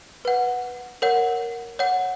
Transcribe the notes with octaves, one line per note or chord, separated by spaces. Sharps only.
B4 F#5
A#4 C#5 F#5
C#5 F#5